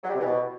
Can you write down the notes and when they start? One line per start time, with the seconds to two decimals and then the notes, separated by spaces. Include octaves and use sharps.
0.04 F#3
0.09 G3
0.14 C3
0.20 E3
0.25 B2